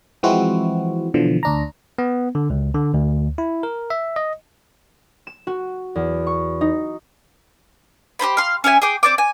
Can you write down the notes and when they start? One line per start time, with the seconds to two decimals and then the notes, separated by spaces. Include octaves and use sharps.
0.23 E3 F3 G#3 C4 E4 F#4
1.14 B2 D3 E3 F3
1.43 D2 D4 A#5
1.98 B3
2.35 D3
2.50 C#2
2.74 D3
2.94 D2
3.38 E4
3.63 A#4
3.90 E5
4.16 D#5
5.27 E7
5.47 F#4
5.95 E2
6.27 C#6
6.61 D#4
8.19 G4 B4 C5 B5
8.37 F5 C6
8.64 C#4 G4 E5 G#5
8.82 G#4 G5 D6
9.03 C4 D5 D6
9.18 G#5